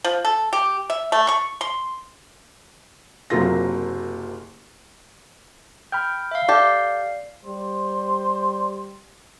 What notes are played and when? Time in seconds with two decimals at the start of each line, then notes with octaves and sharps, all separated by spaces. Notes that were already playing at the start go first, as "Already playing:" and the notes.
0.04 F3
0.25 A4
0.53 G4
0.90 E5
1.12 A3
1.28 C#6
1.61 C6
3.30 F#1 C3 F#3 A#3 F4 A#6
5.92 G5 B5 F6 G6
6.31 E5 F5
6.48 G4 A4 D5 F5
7.45 G3 C5